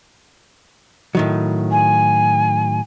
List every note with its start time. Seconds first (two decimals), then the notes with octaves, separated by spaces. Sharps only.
1.15 A2 D#3 F#3
1.71 G#5